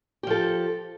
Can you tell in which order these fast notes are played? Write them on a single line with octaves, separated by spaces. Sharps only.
G4 F3 A4